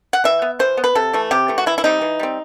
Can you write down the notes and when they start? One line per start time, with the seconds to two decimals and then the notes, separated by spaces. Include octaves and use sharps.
0.13 F#5
0.24 E3 E5
0.42 B3
0.59 E3 C5
0.77 B3
0.84 B4
0.95 C3 A4
1.14 E3 A3
1.31 C3 G4
1.48 E3 A3
1.58 F#4
1.66 E3 E4
1.78 E4
1.84 G3 C4 D#4
2.01 E3
2.19 G3 C4